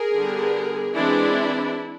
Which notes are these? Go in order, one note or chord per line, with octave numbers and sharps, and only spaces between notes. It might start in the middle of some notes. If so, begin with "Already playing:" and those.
Already playing: G#4 A#4
D3 G3 B3
E3 G#3 C4 D4 E4